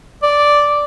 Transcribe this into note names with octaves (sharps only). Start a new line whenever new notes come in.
D5